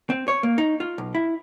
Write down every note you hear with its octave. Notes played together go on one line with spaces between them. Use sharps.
C4
C#5
A#3
D#4
F4
B1
E4